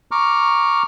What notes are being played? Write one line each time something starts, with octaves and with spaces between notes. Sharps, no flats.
A#5 C#6 D6 F6